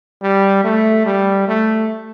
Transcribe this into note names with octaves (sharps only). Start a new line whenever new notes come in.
G3
A3
G3
A3